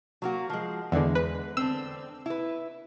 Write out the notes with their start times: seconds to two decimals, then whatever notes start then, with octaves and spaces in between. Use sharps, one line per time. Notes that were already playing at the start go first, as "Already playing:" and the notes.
0.22 F#3 A#3 F#4
0.50 F3 G#3
0.92 E2 D3 G#3
1.15 B4
1.57 D3 C4 E6
2.26 E4 B4